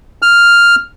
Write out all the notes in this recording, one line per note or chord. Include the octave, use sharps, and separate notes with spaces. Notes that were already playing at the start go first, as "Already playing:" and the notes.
F6